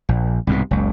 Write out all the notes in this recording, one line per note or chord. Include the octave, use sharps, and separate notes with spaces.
A#1
C2 G#2 B2
F#1 C#2